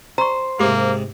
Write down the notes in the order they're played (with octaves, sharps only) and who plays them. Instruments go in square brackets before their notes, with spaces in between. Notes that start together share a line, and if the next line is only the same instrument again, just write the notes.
[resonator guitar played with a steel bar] C5 [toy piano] A#5 C#6
[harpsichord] G#2 C3 [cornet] A#3 [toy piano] G4 D6